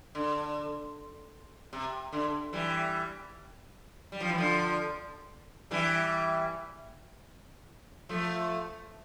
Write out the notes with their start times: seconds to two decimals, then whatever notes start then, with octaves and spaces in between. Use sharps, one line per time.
0.15 D3
1.73 C3
2.12 D3
2.53 E3 G3
4.12 G3
4.20 F3
4.29 E3
4.38 D3 F3
5.71 E3 G3
8.09 F3 A3